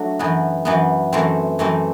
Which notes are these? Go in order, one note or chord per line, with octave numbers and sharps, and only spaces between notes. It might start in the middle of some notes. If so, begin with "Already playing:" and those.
Already playing: F#3 A3 D4 F#4
F#2 E3 B3
F#2 E3 B3
F#2 E3 A3 C4
F#2 E3 A3 C4